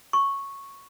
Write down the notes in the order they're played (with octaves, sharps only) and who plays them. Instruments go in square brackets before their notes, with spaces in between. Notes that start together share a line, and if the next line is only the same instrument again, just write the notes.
[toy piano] C#6